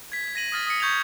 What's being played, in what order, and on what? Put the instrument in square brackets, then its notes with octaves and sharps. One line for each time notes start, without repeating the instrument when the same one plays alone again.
[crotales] G#6 B6
A#6 D#7 F#7
D#6 F6 A6 F#7
D#6 C#7
C#6 G6 G#6 C#7 F7